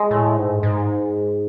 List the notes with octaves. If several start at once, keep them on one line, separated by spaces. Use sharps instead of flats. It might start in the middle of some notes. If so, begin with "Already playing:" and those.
Already playing: G#3
A2
G#2
G#2